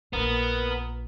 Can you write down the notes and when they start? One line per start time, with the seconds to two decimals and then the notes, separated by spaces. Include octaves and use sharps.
0.13 A#1 B3 F4 A#4 D#6